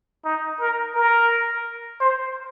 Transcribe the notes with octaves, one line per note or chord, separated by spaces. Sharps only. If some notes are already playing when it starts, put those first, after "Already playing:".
D#4
A#4
A#4
C5